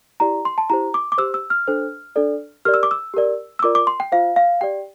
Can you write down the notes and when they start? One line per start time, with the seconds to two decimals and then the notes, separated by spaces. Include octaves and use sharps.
0.20 E4 G4 D5 A#5
0.45 C6
0.58 A5
0.70 E4 G4 C5 A#5
0.94 D6
1.12 D6
1.18 G4 C5 E6
1.34 E6
1.50 F6
1.67 D4 A4 C5
2.16 D4 A4 D5
2.65 G4 A#4 D5 F6
2.74 E6
2.83 D6
2.91 E6
3.14 G4 A#4 D5
3.59 E6
3.63 F4 A#4 D5 D6
3.75 D6
3.87 C6
4.00 G5
4.12 F4 C5 F5
4.36 F5
4.61 G4 D5 G5